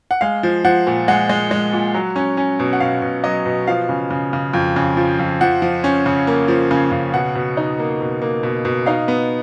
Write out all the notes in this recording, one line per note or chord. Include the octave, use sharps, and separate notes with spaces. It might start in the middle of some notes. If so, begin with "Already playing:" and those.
F#5
G#3 F5
F3
F3 F#5
A#2
G#3 F#5
G#3
G#3
A#2
F#3
C#4
C#4
B2
F#5
B2 F5
B2
F#3 D#5
B2
F3 F5
C#3
C#3
C#3
F2
C#3
F3
F2
F3 F#5
F3
C#4
C#3
A#3
F3
C#3
C#3
B2 F#5
B2
D#4
A#3
B2
A#3
B2
B2
D#4 F5
B3